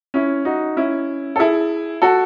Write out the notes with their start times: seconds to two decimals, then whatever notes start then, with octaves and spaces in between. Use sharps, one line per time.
0.14 C#4 E4
0.45 D#4 F#4
0.77 C#4 E4
1.36 A4
1.39 E4 G#4
2.02 F#4 A4